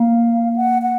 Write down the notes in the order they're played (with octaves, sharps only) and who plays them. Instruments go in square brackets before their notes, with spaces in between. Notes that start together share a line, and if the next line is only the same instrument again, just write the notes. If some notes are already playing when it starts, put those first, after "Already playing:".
Already playing: [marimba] A#3 [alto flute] F5
[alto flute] F#5
F#5